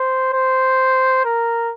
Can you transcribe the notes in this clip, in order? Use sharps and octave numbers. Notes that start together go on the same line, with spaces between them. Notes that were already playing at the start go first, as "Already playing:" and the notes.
Already playing: C5
C5
A#4